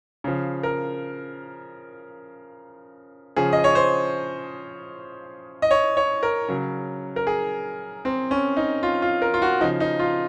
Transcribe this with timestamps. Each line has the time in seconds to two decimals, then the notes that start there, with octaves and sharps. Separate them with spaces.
0.24 C#3 F3
0.63 A#4
3.36 C#3 F3 G#4
3.53 D#5
3.64 C#5
3.75 C5
5.62 D#5
5.71 C#5
5.97 C#5
6.23 A#4
6.48 C#3 F#3
7.16 A#4
7.27 G#4
8.05 C4
8.31 C#4
8.57 D#4
8.83 F4
9.02 F4
9.22 A#4
9.34 F4
9.42 F#4
9.61 C#3 F3 D#4
9.80 D#4
9.99 F4